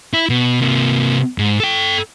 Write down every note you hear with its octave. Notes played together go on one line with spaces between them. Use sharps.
E4
B2
C3 A#3
G#2
A4 G5